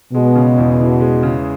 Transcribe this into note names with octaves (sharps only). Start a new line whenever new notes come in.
B2 G#3
C#3
E2
E3
G#3
C#3